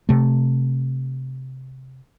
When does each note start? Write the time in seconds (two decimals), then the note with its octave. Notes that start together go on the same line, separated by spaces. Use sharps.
0.09 C3 A3